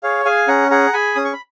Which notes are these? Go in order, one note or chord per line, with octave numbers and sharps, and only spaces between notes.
G#4 C#5 F5
G#4 F5 G#5
C#4 F#5 A#5
G#4 F#5 A#5
G#4 G#5 B5
C#4 D#6
C#6
B5